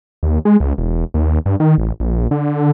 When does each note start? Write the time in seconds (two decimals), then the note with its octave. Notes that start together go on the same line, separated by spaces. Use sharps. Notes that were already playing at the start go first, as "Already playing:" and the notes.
0.23 D#2
0.45 G#3
0.60 C#2
0.78 E1
1.14 D#2
1.46 G2
1.60 D#3
1.78 A1
2.00 A#1
2.31 D3